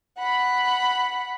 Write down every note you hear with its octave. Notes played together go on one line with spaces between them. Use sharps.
F#5 B5